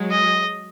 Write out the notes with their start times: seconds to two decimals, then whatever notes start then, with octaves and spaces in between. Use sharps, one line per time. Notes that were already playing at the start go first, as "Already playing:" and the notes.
Already playing: F#3 G#3
0.11 D#5